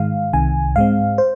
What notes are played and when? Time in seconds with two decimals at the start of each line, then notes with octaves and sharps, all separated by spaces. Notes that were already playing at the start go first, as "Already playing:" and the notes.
Already playing: G#2 D#3 G#3 F5
0.33 C2 C3 D#3 G#5
0.76 G#2 G#3 C4 F5
1.18 C5